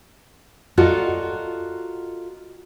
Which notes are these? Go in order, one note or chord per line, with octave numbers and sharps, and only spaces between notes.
F4 F#4 A4 A#4 D5 D#5